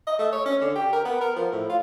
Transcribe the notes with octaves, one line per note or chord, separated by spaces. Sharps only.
D#5
A3
C#5
C#4
D3
G4
A#4
B3
A#4
F3
A2
F4